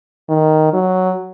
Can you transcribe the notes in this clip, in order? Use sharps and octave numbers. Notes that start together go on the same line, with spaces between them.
D#3
F#3